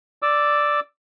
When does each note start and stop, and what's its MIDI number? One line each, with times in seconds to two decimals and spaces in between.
0.22 0.80 74
0.22 0.80 86
0.22 0.80 88